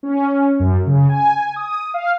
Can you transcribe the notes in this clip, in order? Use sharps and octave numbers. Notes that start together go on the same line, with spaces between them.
C#4
F#2
C#3
G#5
D#6
F5